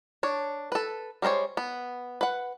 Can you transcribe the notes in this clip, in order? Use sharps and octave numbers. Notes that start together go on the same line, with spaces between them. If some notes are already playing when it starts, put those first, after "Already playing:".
D4 C#5
A4 B4
G3 G#3 A#4 C5 C#5
B3
B4 F#5